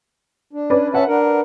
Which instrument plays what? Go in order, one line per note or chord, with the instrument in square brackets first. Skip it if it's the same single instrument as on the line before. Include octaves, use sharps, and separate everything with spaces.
[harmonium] D4
[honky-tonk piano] C#4 B4 D5
[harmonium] C#4 E5 A5 [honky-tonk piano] B4 F#5
[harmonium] D4 A#4